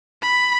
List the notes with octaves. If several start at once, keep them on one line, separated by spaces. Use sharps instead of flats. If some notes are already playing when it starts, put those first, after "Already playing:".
B5